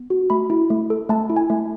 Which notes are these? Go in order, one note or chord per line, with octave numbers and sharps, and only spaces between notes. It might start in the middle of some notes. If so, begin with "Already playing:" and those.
Already playing: B3
F#4
A3 B5
E4
A3
A4
A3 A5
E4
G#5
A3